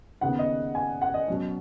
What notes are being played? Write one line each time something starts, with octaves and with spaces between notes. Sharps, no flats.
D#2 C#3 B3 F#5
D#5
G#5
F#5
D#5
B2 F#3 C#4